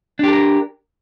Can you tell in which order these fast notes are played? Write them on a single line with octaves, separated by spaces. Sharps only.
D4 G4 A4 A#4